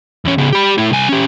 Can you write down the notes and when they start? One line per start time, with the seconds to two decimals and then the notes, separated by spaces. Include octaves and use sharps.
0.25 E2 C#4
0.38 C#3 B3
0.53 G4 B5
0.78 A3 E4
0.92 C2 G#5
1.09 C#4 G4